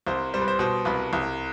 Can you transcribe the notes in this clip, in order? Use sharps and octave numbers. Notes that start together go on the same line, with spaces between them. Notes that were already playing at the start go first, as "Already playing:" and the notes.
C2 C5
G3 C5
B4
C5
B2 C5
C2 B4
C2